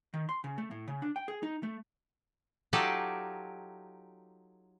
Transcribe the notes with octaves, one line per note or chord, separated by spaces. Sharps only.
D#3
C6
C#3
A3
A2
C#3
D4
G5
G#4
D#4
A3
F#3 D#4 F4 G4 A4 D5